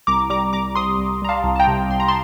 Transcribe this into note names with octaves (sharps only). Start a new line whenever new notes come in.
C2 A#5 D6
G3 A#5 D6
C2 A#5 D6
C3 C6 D#6
C2
G3 A#5
F5 A5
C2
A5
G5 A#5
C3
C2 C6
A#5
A5 C6